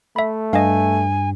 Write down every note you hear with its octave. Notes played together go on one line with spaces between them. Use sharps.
A3 E5 B5
G2 D#5 F5 G#5